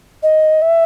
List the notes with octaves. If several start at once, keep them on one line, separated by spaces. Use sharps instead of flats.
D#5
E5